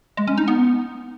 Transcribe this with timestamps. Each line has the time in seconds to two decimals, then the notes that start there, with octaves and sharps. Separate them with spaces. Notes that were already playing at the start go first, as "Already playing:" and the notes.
0.17 G#3
0.27 C#4
0.38 D#4
0.48 B3